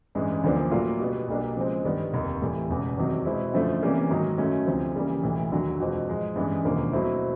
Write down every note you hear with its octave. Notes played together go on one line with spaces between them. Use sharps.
A1 G2 E3 G#3
D2 D3 F3 A#3 D4
A2 F#3 A#3 D4 F4
B2 G3 B3
B1 B2 G3 A#3 D4
C#3 F3 G#3 C4
G2 D#3 G3 B3
F1 D#2 D#3
A2 E3 G3
E1 E2 C#3
E2 C3 D#3 F#3
B2 G#3 C4 E4
F#2 D3 F3 A3
C3 E3 G3 A#3 C#4
G#2 D#3 F#3
F#2 D#3 F#3 A3 C#4
D2 C3 F3
C#3 E3 G3 A#3
B1 A2 E3
D#2 D3 F#3
E2 B2 G#3 C4 F4
G#2 F3 G#3
A1 G2 E3 G#3 B3
E1 D#2 D3 F3 A#3
B2 F#3 A3 C4 E4